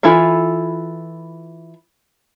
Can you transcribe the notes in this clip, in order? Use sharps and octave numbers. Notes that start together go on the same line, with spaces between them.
E3 E4 F4 A4 E5